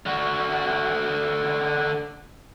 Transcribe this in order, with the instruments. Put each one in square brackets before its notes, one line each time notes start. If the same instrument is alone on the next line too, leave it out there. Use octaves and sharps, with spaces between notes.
[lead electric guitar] D3 F#4